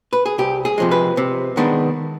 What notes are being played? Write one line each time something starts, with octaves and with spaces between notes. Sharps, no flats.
B4
G#4
C2 G4
G#4
C3 F3 G#3
B4
C3
D#3 G#3 B3 D4